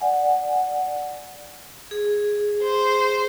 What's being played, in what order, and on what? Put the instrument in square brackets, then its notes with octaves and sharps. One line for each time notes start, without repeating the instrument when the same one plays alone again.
[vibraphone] D5 F#5 G#5
G#4
[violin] C5